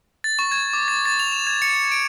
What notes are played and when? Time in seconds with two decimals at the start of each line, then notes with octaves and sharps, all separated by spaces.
0.24 A6
0.39 C#6
0.52 G#6
0.73 D6
0.88 A6
1.06 A6
1.19 F7
1.32 E7
1.47 G#6
1.62 C#7
1.92 D7